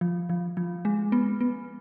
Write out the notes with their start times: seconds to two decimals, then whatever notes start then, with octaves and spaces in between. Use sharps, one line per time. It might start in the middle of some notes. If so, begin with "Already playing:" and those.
0.01 F3
0.30 F3
0.57 F3
0.85 G#3
1.12 B3
1.41 B3